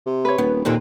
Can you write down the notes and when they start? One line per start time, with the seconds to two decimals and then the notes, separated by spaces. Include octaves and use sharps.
0.06 C3
0.25 B4 C#5
0.38 D#1 B3
0.65 D#2 A#2 D3 C4